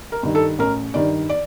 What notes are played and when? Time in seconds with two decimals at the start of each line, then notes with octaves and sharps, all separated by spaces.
0.12 A#4
0.23 G2 D#3
0.35 A4
0.59 A1 A#4
0.94 G2 D#3 D5
1.29 D5